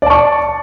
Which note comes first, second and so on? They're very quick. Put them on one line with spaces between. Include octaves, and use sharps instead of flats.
D5 A5 C#6